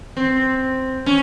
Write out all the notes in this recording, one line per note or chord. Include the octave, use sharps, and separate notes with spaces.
C4
C#4